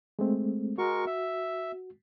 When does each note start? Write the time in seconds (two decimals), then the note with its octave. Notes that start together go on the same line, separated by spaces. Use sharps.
0.19 G#3 A3 C4
0.78 G#3 F#4 A#4 C#6
1.07 E5